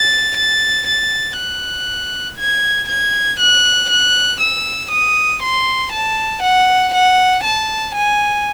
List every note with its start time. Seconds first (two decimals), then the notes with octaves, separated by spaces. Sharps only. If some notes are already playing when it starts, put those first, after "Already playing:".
Already playing: A6
0.37 A6
0.87 A6
1.37 F#6
2.39 G#6
2.89 G#6
3.40 F#6
3.90 F#6
4.40 E6
4.91 D#6
5.42 C6
5.92 A5
6.43 F#5
6.94 F#5
7.44 A5
7.95 G#5